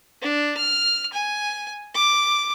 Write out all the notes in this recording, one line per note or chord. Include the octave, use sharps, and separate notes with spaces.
D4
F6
G#5
D6